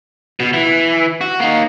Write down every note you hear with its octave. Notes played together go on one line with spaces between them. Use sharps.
B2
E3
F#4
A#3 D#4